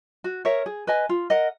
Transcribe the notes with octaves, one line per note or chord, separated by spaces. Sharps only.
F#4
A#4 C#5 E5
G#4
B4 D#5 G#5
F4
A#4 D#5 F#5